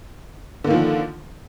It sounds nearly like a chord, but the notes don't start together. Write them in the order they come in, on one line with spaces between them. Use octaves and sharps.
D3 A#3 D#3 F3